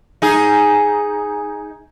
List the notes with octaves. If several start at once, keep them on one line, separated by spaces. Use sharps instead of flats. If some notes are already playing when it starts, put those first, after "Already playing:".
D#4 G#4